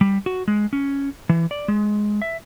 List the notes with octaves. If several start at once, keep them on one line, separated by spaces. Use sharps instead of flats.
G3
F#4
G#3
C#4
E3
D5
G#3
E5